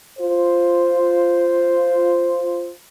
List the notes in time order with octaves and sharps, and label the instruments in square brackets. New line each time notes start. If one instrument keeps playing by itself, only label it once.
[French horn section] F4 C5